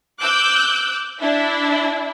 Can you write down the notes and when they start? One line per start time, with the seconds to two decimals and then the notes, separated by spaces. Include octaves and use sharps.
0.20 D6 E6 F#6 G6
1.20 D4 E4 E5